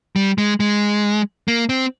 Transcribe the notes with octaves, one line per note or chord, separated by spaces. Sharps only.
G3
G#3
G#3
A#3
C4